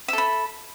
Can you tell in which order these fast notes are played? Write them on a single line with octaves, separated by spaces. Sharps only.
E5 A4 B5